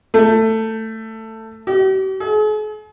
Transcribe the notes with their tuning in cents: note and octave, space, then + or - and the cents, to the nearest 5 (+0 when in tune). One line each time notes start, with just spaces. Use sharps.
A3 +15
G4 -45
G#4 +45